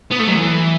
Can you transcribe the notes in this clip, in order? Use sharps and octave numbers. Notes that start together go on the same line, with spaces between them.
B3
A3
F#3
E3